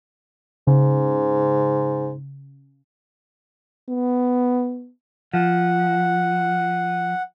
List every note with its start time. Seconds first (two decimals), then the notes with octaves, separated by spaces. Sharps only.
0.67 G#2 C#3
3.89 B3
5.34 F3 F#5